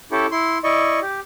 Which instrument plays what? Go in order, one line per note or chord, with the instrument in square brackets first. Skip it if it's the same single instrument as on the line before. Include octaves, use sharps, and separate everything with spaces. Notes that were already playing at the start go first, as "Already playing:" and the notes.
[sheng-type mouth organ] C#4 E4 G4 A4
E4 C6
E4 D5 D#5 C#6
G4